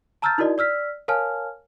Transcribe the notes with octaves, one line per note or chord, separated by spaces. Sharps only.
A5 A#5 E6 F6 G6 A6
D#4 E4 F#4 A#4 D5 D#5
D5 E6 F6 B6
A#4 C#5 F5 G#5 A5 F6